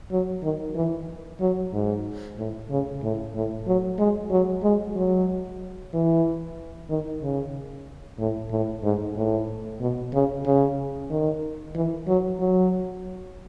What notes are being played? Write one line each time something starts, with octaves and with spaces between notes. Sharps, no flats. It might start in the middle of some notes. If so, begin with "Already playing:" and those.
F#3
D#3
E3
F#3
G#2
A2
C#3
A2
A2
F#3
G#3
F#3
G#3
F#3
E3
D#3
C#3
A2
A2
G#2
A2
B2
C#3
C#3
D#3
E3
F#3
F#3